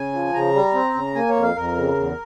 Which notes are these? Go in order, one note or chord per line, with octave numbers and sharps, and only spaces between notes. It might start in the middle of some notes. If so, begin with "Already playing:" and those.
Already playing: C#3 G#5
F3
C#3 A#5
G3
C4
C#3
A#3 G#5
C#5
F2
F5
F2 A#4
C#3
E2